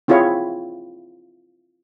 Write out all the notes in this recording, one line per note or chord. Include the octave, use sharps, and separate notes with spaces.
C4 E4 F4 G#4 C#5 E5